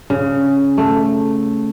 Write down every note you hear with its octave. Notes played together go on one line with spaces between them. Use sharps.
C#3
A3